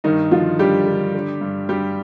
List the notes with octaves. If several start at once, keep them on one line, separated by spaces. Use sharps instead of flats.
G2 D#3 D#4
D3 F3 F4
D3 G3 G4
D3
D3
G2
G2 G3 G4